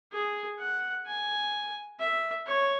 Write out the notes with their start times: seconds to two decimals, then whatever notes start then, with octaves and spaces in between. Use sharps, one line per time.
0.12 G#4
0.60 F#5
1.06 G#5
2.00 E5
2.47 C#5